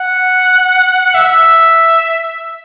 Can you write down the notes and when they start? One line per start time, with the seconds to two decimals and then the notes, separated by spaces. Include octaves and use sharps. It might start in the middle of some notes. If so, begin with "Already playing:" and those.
Already playing: F#5
1.15 E5
1.31 E5